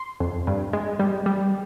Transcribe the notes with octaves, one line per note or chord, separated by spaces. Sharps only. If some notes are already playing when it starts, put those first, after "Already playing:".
Already playing: C6
F2
G2
G#3
G3
G3